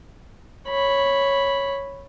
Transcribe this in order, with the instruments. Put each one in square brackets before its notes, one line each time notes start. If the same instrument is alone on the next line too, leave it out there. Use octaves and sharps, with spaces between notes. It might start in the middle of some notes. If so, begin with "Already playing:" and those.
[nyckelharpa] C#5 B5